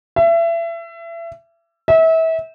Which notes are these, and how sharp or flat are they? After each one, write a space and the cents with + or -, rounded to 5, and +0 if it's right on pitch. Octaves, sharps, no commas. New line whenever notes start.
E5 +30
E5 -30